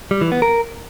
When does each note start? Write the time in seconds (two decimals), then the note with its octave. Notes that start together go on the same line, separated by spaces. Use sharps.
0.11 G3
0.21 E3
0.32 B3
0.42 A#4